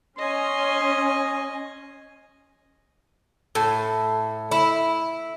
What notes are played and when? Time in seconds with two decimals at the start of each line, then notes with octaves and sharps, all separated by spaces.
0.18 C#4 D#5 G#5 C6
3.55 A2
4.51 E4